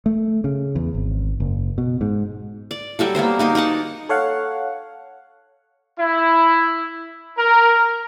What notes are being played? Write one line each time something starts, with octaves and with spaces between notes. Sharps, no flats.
A3
C#3
E2
G#1
F#1
B2
G#2
D5
F#3 G3 F#4 A4
A#3 B3 A#4 C5
A#3 D#4 F#4 G4
D#4 A#4 F#5 A5
A4 C#5 F5 F#5
E4
A#4